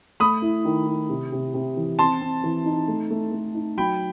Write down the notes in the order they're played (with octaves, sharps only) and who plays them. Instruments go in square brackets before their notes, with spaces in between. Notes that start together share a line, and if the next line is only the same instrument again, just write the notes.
[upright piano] A3 [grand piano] B5 D#6
[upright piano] E4
D#3
E4
C3
C3
C3
E3
[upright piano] C4 [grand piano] A5 C6
[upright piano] C4
E3
D#4
A3
A3
A3
D#4
[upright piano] F#3 [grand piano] G5 B5